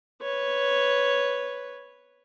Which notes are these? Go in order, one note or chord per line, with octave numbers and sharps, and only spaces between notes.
B4 C#5